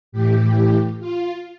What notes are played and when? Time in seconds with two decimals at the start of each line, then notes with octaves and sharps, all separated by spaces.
0.12 A2 E3 G4
1.00 F4